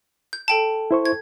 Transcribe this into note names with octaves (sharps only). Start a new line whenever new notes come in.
G6
A4 G5 A5
E4 C5 C#6
G#6